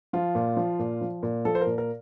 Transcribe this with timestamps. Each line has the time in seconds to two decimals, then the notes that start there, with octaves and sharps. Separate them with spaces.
0.13 F3 F4
0.35 A#2
0.57 F3
0.79 A#2
1.01 F3
1.23 A#2
1.45 F3 A4
1.55 C5
1.61 A#2 A#4
1.78 A#4